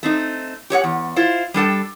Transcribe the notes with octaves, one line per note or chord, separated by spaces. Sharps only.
A3 C4 D#4
G4 C#5 D#5 F#5
E2
E4 F4 C5
G3 D4 A4 G5